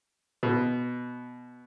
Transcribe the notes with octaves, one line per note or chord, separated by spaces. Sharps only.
B2